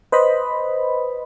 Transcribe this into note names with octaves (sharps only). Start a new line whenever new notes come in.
B4 C5 D#5 B5